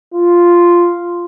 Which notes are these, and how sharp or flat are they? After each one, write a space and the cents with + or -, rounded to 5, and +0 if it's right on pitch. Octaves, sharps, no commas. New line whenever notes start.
F4 -5